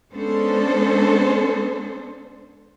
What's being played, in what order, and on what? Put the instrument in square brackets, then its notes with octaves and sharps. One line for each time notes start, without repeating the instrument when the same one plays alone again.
[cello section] G#3 B3 C#4 D4 A4 C5